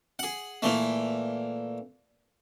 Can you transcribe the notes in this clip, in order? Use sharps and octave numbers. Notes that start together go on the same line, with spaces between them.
G#4 F#5
A#2 E3 A3